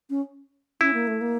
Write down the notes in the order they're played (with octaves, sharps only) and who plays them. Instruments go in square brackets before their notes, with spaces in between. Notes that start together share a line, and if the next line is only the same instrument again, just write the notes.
[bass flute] C#4
[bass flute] C#4 [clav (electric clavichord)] E4
[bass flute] A#3
A3
A#3